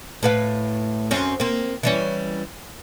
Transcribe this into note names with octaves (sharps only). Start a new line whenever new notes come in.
A2 B4 F5
F#2 C4 C#4
A#3 C4
E3 G3 C#4